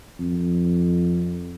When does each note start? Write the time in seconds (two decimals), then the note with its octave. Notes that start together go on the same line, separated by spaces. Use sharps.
0.19 F2